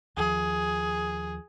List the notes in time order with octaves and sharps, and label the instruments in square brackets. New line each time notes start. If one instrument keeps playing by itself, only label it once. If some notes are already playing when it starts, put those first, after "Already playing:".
[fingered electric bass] D#2 F3 [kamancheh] G#4